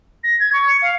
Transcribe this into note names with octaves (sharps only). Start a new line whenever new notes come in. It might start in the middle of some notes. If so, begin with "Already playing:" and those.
A#6
G#6
C#6
C#7
F5